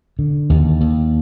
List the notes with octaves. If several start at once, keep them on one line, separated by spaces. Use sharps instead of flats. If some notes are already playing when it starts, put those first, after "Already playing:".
D3
D#2
D#2